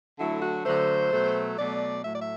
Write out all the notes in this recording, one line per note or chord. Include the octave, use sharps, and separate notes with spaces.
D3 F#3 A3 E4
F#4
D3 F#3 A3 C5
B2 F#3 A3
B2 F#3 A3 D5
A2 F#3 A3 E5
D5
E5